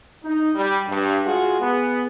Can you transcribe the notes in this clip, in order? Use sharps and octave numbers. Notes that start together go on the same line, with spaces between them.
D#4
G3
G2
G#3 F4 F#4 G#4
B3 G#4